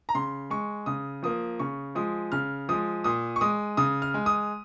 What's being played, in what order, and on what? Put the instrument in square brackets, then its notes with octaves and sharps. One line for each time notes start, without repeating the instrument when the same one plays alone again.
[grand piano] A#5
C#3 C6
G#3 C#6
C#3 D#6
F3 A#3 D#6
C#3 C#6
F3 G#3 D#6
C#3 F6
F3 G#3 D#6
A#2 D#6
C#6
G#3 D#6
C#3 D#6
F6
G#3
D#6